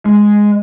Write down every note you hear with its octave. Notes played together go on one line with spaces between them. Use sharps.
G#3